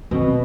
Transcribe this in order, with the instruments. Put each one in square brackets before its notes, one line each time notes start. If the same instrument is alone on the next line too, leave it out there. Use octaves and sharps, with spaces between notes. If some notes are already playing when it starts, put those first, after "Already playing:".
[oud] B2 [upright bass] C4